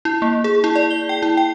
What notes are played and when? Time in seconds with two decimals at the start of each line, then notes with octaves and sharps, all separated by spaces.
0.05 E4
0.22 A#3
0.44 G#4
0.64 E4
0.75 D5
0.91 G7
1.09 G5
1.22 E4
1.37 G5